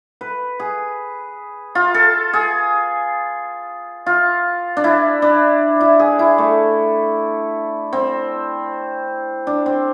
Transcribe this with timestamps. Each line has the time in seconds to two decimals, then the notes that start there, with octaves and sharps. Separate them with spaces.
0.21 B4
0.60 G#4
1.75 F4
1.94 A4
2.33 G#4
4.06 F4
4.77 D4
4.84 E4
5.22 D4
5.81 E4
5.99 G#4
6.19 E4
6.38 A3
7.93 C4
9.47 D4
9.66 C4